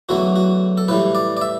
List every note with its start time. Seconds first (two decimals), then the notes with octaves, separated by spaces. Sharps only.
0.09 E2 D3 F#3 A3 F#4
0.36 F#4
0.77 A4
0.88 A2 E3 G3 B4
1.15 D5
1.37 D5
1.41 E5